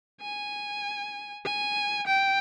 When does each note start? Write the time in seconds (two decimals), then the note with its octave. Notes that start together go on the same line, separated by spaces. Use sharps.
0.21 G#5
1.45 G#5
2.07 G5